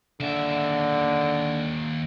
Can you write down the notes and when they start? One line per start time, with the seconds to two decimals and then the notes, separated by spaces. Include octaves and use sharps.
0.20 D#2 D3 E5